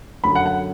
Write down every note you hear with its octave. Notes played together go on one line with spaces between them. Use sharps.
F#2 D3 F#3 B5
F#5
F#5